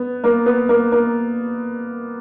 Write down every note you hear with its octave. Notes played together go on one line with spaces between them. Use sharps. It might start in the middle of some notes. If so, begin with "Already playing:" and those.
Already playing: B3
A#3
B3
A#3
A#3